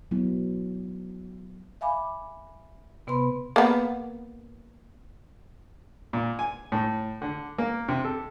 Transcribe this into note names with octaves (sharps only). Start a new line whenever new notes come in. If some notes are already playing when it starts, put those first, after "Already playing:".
F#3 B3 E4
E5 F5 G#5 B5 D6
C3 B3 B4 B5 C6
A#3 B3
A#2
G#5
A2
D3
A#3
C3
A4